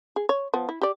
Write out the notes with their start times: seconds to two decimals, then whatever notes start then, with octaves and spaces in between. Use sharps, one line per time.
0.16 G#4
0.29 C#5
0.54 F3 B3
0.69 E4
0.81 G4 D5